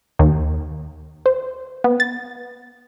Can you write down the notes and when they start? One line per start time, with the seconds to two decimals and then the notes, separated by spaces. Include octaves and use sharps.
0.19 D#2
1.26 C5
1.84 B3
2.00 A6